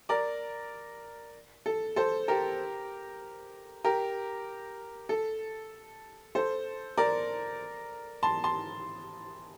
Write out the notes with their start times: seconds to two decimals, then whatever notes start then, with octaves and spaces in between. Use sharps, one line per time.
0.09 A#4 D5
1.66 A4
1.96 A4 C5
2.28 G4 A#4
3.84 G4 A#4
5.09 A4
6.35 A4 C5
6.97 A#4 D5
8.23 A5 C6
8.44 A5 C6